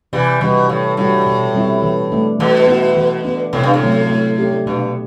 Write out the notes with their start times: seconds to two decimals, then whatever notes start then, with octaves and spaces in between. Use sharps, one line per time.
0.13 C3 E3 G3
0.41 B2 E3 G3 D4
0.69 A2 E3
0.97 A2 G3 D4 F#4
1.26 B2
1.55 G3 C4 E4
1.83 E3
2.12 A3 D4
2.40 B2 E3
2.67 B3 E4
2.96 E3
3.25 B3 D4
3.53 A2 C3
3.63 G2
3.74 A2
3.82 F#3 A3 C4
4.10 A3
4.38 D4 G4
4.66 G2 B2